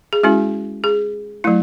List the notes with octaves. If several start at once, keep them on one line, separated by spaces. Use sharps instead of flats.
G#4
G#3 C#4 E4 F#4
G#4
F#3 A3 E4